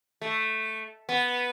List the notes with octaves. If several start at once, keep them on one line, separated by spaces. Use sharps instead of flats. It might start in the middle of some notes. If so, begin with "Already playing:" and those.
A3
B3